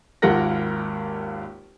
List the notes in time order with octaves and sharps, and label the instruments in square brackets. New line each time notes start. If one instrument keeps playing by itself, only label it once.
[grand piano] G#1 D#2 F4 A#4 F#5 A#6